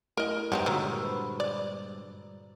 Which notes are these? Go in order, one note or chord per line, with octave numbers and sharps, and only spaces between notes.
A3 E4 A#4 D#5
G2 D#3 G#3 C4 D#4 B4 F#5
A#2 D3 D#3 F#4 C#5 A#5 E6
B4 C5
D5